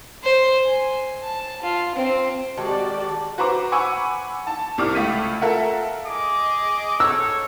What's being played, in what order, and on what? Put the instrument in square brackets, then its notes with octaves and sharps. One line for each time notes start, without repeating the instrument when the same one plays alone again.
[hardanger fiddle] C5
G#5
A5
F4
C4
[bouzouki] D#3 G#3 A4 [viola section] F#4 G4 D5
[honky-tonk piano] F#4 B4 C5 A#5 D6
F#5 G#5 B5 C#6 D6 E6
A5
C2 C3 D6 F6
C#2 A3 B6 D#7
F4 A4 A#4 E5 F#5
[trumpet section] G#4 D#5 D6
[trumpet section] A4 C#5 [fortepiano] E6